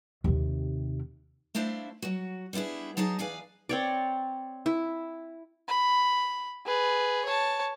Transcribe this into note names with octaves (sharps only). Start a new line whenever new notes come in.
D#2 C3
A3 D4 E4 C5 E5 F5
F#3 F#4
G3 B3 D4 E4 G#4
F#3 D#4 G#4 A5 A#5
E2 G#4 B4 D5 F5 G#5
C4 C#5 D5
E4
B5
G#4 B4
C#5 A5